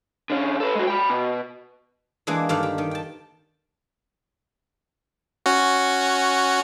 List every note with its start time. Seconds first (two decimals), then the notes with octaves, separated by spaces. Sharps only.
0.30 D3 C#4
0.60 A4 B4
0.75 G#3 F#4
0.87 G5 B5
1.10 B2
2.27 E3 G#3 A#3 D4 G#4
2.49 G2 D3 D#3 D4 D5 F5
2.63 G4
2.78 D#3
2.91 G5 A5
5.46 C#4 F#4